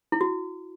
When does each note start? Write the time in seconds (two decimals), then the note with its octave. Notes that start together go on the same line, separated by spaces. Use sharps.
0.12 E4
0.21 F#4